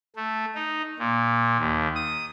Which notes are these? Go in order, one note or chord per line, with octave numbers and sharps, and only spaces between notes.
A3
D#4
A#2
D#2
D#6